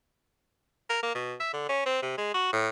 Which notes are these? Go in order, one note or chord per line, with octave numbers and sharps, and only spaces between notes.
A#4
A#3
B2
E5
D3
C#4
C4
C3
G#3
F#4
A2